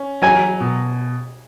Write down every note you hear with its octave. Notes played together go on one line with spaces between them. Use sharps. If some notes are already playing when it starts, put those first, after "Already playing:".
Already playing: C#4
F#3 G#5
B2